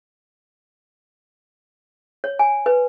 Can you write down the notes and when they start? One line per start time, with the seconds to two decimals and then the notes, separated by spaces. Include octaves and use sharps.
2.24 C#5
2.39 G#5
2.66 B4